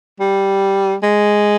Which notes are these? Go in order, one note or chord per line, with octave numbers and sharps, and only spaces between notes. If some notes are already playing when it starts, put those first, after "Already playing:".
G3
G#3